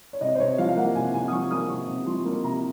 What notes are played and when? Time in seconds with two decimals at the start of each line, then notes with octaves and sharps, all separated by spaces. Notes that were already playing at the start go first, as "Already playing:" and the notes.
0.13 C#5
0.21 C3 D#5
0.35 C5
0.40 C3 C#5
0.58 F3 F5
0.69 F5
0.77 A#3 F#5
0.95 C3 G#5
1.14 C3 G#5
1.28 D#6
1.32 F3 C#6
1.51 A#3 D#6
1.69 C3 C#6
1.88 C3
2.06 F3 C6
2.26 A#3
2.44 C3 A#5